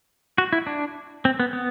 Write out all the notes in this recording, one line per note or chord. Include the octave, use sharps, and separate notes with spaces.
F#4
E4
D4
C4
B3
B3